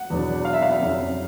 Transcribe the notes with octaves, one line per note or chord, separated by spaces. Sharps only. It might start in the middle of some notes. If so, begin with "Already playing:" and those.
Already playing: F#5
E2 B2 F#3 B3 D4
F5
E5
F5
F2 C#3 F#3